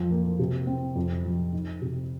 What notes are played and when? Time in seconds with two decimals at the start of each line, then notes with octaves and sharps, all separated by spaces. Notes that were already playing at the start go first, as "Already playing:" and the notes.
Already playing: F2 F3
0.11 A#3
0.39 C3
0.67 C4
0.96 F2
1.25 F3
1.53 D#4
1.82 C3